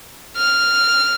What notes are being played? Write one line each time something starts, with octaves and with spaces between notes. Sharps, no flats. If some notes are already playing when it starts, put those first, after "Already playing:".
F6